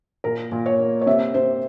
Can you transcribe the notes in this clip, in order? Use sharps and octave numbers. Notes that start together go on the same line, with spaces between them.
A#2 A#4
A#2
C#5
A#3
C#5
C3 E5
C3 C5